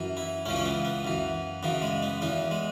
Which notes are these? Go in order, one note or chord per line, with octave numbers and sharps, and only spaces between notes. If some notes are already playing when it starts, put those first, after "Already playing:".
Already playing: F#2 E3
E4
C#2 C#3 E3 C#4
C#4
B3
B3
F#2 E3
F#2 C#3 E3 B3
G#3
B3
E2 E3 B3
G#3